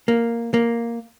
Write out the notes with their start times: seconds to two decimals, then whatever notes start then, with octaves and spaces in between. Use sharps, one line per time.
0.08 A#3
0.54 A#3